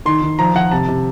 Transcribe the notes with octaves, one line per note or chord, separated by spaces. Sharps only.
D#3 C6
D#3
F3 A#5
F3 F#5
C3 A5
C3